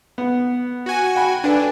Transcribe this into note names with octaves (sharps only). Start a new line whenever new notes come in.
B3
F#4 G#5
G5 B5
D4 A4 B4 G#5